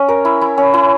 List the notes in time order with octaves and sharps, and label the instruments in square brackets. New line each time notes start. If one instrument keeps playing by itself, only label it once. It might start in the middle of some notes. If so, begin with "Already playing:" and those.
Already playing: [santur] C#4
A#4
E4
E4
C#4
E4